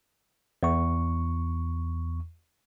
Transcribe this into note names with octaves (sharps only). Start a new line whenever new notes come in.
E2 C#6